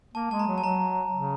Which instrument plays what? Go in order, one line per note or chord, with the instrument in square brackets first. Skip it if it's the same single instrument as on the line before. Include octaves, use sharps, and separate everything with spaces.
[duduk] A#3 [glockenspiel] A5
[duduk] G#3 [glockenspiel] A5
[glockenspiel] A#5
[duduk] F#3
[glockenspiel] A5
[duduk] F#3 [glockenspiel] A#5
[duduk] C#3